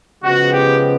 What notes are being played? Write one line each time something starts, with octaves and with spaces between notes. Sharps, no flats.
C#3 F3 G#3 B3 F#4
G4